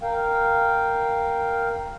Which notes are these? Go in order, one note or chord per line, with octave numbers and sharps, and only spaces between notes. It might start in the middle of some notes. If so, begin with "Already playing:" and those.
A#4 F5 G5